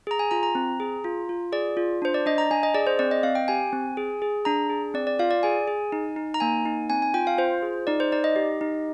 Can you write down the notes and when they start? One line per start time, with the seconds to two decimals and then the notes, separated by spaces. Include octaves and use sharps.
0.07 G#4 A#5
0.19 G#5
0.31 F4 A#5
0.43 A#5
0.55 C4
0.80 G#4
1.04 F4
1.29 F4
1.52 G#4 D5
1.77 F4
2.02 D4 C5
2.14 D5
2.26 D4 D#5
2.38 A#5
2.51 D4 G#5
2.63 D#5
2.74 G#4 D5
2.87 C5
2.99 C4 D5
3.11 D#5
3.23 C4 F5
3.35 G5
3.48 G4 G#5
3.73 C4
3.97 G#4
4.22 G#4
4.45 D4 A#5
4.70 G#4
4.94 C4 D5
5.07 D5
5.19 F4 F5
5.31 D5
5.43 G#4 G#5
5.67 G#4
5.92 D#4
6.16 D#4
6.34 A#5
6.40 A#3 G#5
6.66 D#4
6.90 C4 G#5
7.02 G#5
7.14 F4 G5
7.27 F5
7.38 F4 C5
7.62 G#4
7.87 D#4 D5
8.00 C5
8.12 D#4 D5
8.24 D#5
8.36 G4
8.61 D#4